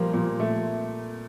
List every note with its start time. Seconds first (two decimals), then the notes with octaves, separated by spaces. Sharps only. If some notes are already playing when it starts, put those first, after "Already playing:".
Already playing: A#2 F3 G3 A#3
0.14 A#2
0.40 A3